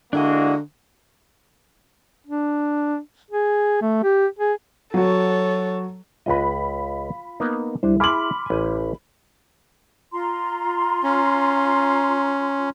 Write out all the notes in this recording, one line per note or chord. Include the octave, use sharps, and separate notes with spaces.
D3 G#3 A#3 D4 E4 F#4 D#5
D4
G#4
A3
G4
G#4
F#3 F#4 A4 C#5
C#2 F4 B4 D#5 B5
A#3 B3 D#4
C#2 G3 D4 E4 C5
E4 G#4 G#5 B5 C6 D6 F6 F#7
A1 G#5
F4 A#5 C6
C#4